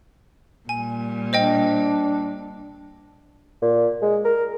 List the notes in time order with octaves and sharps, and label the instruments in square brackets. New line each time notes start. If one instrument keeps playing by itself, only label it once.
[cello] A#2 G3 [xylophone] G#5
[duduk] D4 [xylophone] C5 D#5 G5
[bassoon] A#2
G#3
A#4